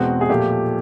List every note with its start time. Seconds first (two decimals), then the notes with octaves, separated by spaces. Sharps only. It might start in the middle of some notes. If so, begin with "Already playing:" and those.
Already playing: E2 B2 G#3 C4 F#4
0.21 G#4
0.29 A#2 F3 A3 G4